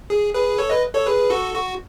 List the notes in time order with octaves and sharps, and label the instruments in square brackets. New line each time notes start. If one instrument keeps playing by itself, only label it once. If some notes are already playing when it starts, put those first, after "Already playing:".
[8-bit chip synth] G#4
G#4 B4
A4 C#5
B4 D#5
A4 C#5
G#4 B4
F#4 A4
F#4